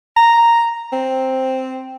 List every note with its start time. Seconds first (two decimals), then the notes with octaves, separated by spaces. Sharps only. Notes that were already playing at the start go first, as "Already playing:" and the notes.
0.17 A#5
0.93 C4